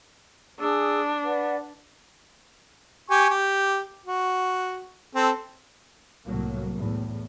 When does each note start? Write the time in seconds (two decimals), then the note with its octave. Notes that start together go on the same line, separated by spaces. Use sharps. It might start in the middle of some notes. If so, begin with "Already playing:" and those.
0.59 D4 G#4 D#6 E6
1.24 B4 D5 F#5
3.10 G4 G#5 C#6
3.30 G4
4.06 F#4
5.15 C4 A4
6.25 C2 A2 F#3 A#3
6.76 E2 A2